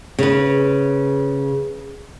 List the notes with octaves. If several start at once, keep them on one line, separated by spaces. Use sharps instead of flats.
C#3 B4